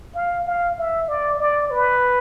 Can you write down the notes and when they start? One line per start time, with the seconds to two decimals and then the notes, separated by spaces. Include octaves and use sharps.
0.15 F5
0.47 F5
0.78 E5
1.08 D5
1.39 D5
1.71 B4